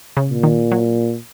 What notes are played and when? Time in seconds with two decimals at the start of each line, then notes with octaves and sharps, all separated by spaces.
0.17 C#3
0.30 A#2
0.43 D#3
0.72 F#3